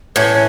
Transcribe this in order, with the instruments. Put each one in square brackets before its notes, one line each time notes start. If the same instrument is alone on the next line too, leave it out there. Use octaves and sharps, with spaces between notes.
[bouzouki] A2 E3 C#4 [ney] B4